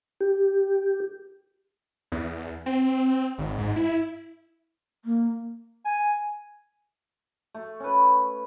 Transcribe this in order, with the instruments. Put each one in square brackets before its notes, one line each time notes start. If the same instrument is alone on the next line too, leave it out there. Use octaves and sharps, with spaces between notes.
[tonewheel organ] G4
[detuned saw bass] E2
C4
G#1
G#2
E4
[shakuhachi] A#3
[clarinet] G#5
[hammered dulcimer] A3
C#4 B4